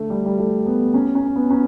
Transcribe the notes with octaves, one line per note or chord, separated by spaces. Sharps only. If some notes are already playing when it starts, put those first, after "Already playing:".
Already playing: D3 A3
G3
G3
A3
B3
C#4
C#4
B3
C#4